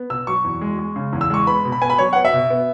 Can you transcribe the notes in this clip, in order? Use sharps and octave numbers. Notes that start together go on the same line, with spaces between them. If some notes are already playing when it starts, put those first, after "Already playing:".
Already playing: B3
B2 E6
F#3 C#6
E2
G#3
G#3
C#3
E2
E6
G#3 C#6
B3 B5
B2
B5
B3 G#5
B5
F#3 C#5
B3 F#5
E5
B2
B3